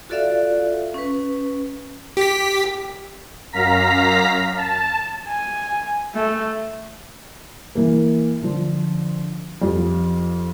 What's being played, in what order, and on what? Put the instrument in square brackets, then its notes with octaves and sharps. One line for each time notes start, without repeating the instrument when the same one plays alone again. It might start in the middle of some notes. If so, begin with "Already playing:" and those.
[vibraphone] F4 F#4 A4 D5 E5 F5
C#4 B4
[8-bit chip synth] G4 B6
[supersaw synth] F#2 F5 A#5 B6
A5
[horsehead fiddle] G#5
A3
[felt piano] E3 A#3
D3 F3
F2 F4 G4